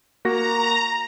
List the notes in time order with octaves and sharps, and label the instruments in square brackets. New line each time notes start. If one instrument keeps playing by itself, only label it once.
[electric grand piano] A#3 F#4 A#6 [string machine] A#5